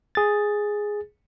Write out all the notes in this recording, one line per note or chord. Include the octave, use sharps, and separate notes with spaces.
G#4 A6